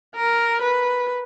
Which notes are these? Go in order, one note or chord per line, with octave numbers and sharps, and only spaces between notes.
A#4
B4